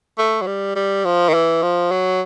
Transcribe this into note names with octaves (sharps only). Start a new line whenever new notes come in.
A3
F#3
G3
G3
F3
D#3
E3
F3
F#3